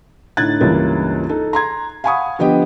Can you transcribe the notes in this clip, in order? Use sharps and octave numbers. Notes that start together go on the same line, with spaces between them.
A2 D3 D#4 F#6 G#6 A6
C#2 G2 E3 G3 A#3 C#4
D#4 A4
A#5 C6 G#6
F5 F#5 G#5 B5 C#6 D#6
D3 F3 B3 G4 D#5 G5